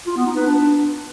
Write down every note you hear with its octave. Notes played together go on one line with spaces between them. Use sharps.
F4
B3
D#4
B4
D4